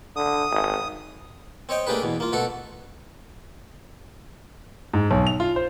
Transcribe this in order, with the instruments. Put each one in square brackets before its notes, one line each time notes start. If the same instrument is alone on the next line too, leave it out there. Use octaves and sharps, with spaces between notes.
[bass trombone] D3 [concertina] D#6
[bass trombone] G#1
[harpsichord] C4 C#5 D#5 G5
A3 A#3 D4 G4 G#4 B4
E2 B2
A#3 F4
B2 A3 F#4 A4
[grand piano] G#2
B1
F7
F4
C5